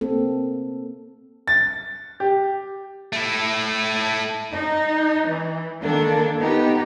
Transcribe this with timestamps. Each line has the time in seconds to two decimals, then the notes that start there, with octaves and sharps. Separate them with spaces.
0.01 A#3 C4 A4
1.48 A6
2.20 G4
3.13 A3 E4
4.51 D#4
5.28 E3
5.81 D#3 A#3 D4 A4
6.38 B3 D#4 G4